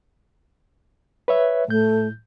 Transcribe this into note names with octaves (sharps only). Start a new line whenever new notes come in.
B4 C#5 E5
A2 A3 G6